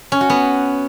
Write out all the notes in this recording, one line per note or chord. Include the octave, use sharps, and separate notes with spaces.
C#4
F#4
B3